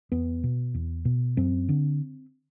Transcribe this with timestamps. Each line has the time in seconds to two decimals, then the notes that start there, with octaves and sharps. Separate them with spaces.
0.12 E2 B3
0.44 B2
0.74 E2
1.05 B2
1.37 F#2 C4
1.69 D3